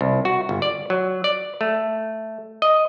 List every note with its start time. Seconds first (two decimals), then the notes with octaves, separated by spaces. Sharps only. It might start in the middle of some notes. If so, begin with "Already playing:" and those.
0.01 C2
0.25 F#4
0.49 G1
0.62 D5
0.90 F#3
1.24 D5
1.61 A3
2.62 D#5